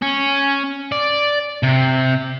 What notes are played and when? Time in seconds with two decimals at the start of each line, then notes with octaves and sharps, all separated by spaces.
0.02 C#4
0.92 D5
1.63 C3